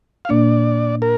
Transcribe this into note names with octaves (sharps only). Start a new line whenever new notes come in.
F5
A#2 A#3 D4 D5
A#4